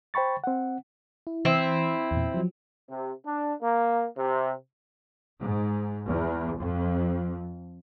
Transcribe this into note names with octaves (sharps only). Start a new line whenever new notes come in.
C5 G5 B5 C#6 A6
C4 F#5
E4
E3 C4 E4
E2 A#2
F3 F#3
C3
D4
A#3
C3
G#2
E2
F2